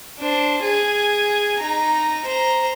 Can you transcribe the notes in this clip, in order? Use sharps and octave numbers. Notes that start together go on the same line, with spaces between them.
D4 C5
G#4 G#5
D#4 A#5
C5 A#5